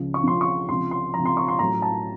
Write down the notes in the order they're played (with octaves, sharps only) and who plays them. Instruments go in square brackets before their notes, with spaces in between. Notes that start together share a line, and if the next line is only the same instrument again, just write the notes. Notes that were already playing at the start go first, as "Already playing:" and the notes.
Already playing: [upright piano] C#2 C#3 F3
C#6
C#2 C#3 F3 C6
C#6
C#2 C3 F3 C6
C6
C#2 C3 F3 A#5
C6
C#6
C6
A1 A2 F#3 A#5
A5